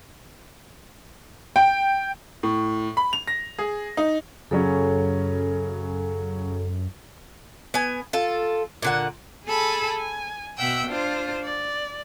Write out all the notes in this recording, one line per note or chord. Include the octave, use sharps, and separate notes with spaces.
G5
A2
B5
F7
A#6
G#4
D#4
F#2 C#3 F#3 C#4 A4
B3 G#5
F4 A4
A#2 D3 F#5
G#4 A4 G#5 A5 B5
G#5
B2 E5 F#5 G5 E6
D4 F4 C5
D5